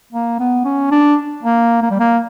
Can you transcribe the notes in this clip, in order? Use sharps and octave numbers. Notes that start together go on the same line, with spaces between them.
A#3
B3
C#4
D4
A#3
A#3
G3
A#3